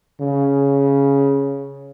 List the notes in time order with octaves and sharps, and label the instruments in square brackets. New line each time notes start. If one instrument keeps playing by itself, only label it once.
[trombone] C#3